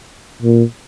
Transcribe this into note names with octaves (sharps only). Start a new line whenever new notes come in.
A#2